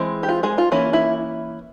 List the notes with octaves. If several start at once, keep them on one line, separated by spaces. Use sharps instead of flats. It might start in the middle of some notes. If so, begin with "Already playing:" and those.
Already playing: E3 G#3 C4
G4
F4
G#3 G#4
F4
E3 A#3 C#4 E4
E4